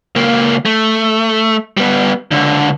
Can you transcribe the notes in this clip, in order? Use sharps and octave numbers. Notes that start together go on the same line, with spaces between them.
C#2 A#3
A3
G3 B3
C#2 D3